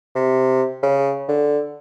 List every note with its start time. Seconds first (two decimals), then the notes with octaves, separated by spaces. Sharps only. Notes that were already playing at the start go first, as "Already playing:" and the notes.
0.15 C3
0.83 C#3
1.29 D3